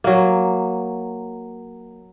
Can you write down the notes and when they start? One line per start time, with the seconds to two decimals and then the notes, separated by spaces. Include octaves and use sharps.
0.04 F#3 A#3